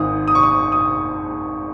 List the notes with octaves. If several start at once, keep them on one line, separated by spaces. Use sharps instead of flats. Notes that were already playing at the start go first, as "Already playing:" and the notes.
Already playing: G#1 G#2 D#3 D#6
D#6
C#6
D#6
D#6